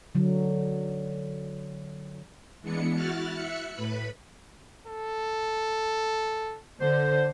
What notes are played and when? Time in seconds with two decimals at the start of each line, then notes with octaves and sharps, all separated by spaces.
0.15 D3 F#3
2.62 E3 G#3 B3 D4 C#7
2.94 E4 F#4 F6 F#6 A6
3.33 E5 F#6 C#7
3.75 A2 B4 B5
4.87 A4
6.81 D3 C5